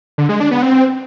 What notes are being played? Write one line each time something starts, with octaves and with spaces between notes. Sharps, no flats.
D3
G#3
D4
B3
C4